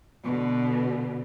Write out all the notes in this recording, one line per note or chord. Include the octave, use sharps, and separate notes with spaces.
B2 D3